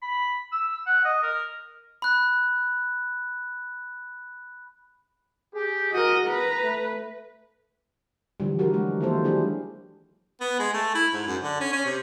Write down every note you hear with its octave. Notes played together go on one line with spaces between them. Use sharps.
B5
E6
F#5
D#5
A#4
B5 F#6
G4 G#4
F#4 A#4 D#5
B4 A#5
A3
D3 E3 F3 G3
F#3 F#4 G4 A#4
G#3
D#3 E3 A#3 E4 A4 C5
F#3 D4 G4 G#4
B3
G#3
A3
E4
G#2
F#2
D3
C#4
C#4
C3